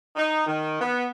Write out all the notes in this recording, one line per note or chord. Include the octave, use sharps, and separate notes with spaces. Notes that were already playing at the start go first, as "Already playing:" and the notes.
D#4
D#3
B3